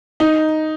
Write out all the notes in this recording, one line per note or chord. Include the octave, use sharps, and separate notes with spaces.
D#4